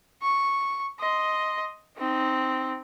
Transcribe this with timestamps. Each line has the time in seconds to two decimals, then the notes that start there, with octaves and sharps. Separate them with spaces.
0.23 C#6
0.99 D#5 C6
1.97 C4 D#4